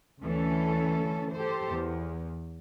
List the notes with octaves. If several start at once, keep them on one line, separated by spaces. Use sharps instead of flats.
D2 E3 C#4 A4
G4 A4 C5
E2